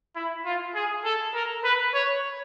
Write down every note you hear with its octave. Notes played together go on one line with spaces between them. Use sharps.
E4
F4
G#4
A4
A#4
B4
C#5